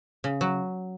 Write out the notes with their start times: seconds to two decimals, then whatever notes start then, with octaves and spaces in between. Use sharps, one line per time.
0.24 C#3
0.41 F#3